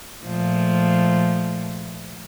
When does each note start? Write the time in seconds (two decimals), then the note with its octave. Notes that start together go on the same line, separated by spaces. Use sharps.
0.23 A#2 F3 A3